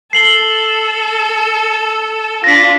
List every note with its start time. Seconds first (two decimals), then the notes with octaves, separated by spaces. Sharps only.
0.13 A4 C7 F#7 G7
2.44 D4 F4 A#6 B6